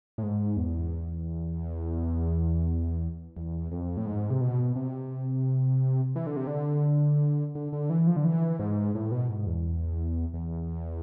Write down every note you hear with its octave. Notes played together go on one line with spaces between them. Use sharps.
A2
G#2
E2
E2
F2
A2
G#2
C3
B2
C3
E3
D3
C3
D3
D3
D3
E3
F3
D3
E3
G#2
A2
B2
G#2
E2
E2